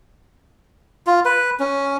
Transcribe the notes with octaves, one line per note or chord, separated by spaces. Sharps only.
F4
B4
C#4